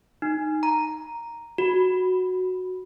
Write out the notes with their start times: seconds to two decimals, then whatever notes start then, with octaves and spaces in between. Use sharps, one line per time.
0.22 D#4
0.63 A#5
1.58 F#4